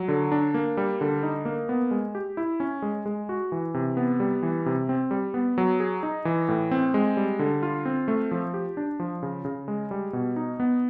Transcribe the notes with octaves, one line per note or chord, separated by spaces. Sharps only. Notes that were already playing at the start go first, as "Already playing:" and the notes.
Already playing: F#3
D3
D4
A#3
G3
D3
D#4
A#3
B3
G#3
G4
E4
C#4
G#3
G#3
F#4
E3
C3
B3
G3
E3
C3
C4
G3
B3
F#3
G#4
D#4
E3
A2
C4
G#3
G3
D3
F4
C4
A3
F3
G4
D4
F3
C#3
C#3
G#3
G3
B2
D#4
B3